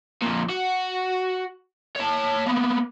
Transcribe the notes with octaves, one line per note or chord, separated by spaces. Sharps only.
F2 A#2
F#4
C#5 A5
A#3 B3